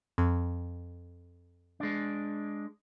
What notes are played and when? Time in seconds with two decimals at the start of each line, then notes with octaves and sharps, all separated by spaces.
0.18 F2
1.80 G#3 D4